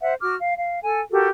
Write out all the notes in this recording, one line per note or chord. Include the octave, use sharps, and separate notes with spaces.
C5 E5 F#5
F#4 D6 F6
F5
F5
A4 G#5
F#4 G4 A4 A#4